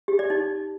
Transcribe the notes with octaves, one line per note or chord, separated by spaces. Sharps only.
G4
D5
D#4